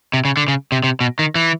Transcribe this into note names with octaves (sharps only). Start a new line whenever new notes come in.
C3
C#3
D3
C#3
C3
C3
B2
D#3
E3